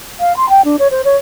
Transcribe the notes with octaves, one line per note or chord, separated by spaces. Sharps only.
F5
C6
G5
D4
C#5
C5
C#5